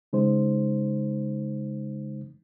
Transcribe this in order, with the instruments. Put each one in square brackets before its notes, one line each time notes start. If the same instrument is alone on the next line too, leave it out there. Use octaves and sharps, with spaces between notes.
[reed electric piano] C#3 G#3 D#4 C5